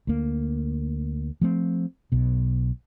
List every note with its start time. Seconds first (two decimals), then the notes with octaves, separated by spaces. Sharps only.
0.07 D2 A#3
1.41 F3 A3 C4
2.12 B1 B2